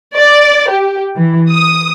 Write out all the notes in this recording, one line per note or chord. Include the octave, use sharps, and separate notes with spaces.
D5
G4
E3
D#6